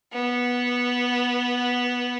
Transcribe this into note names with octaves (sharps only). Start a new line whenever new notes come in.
B3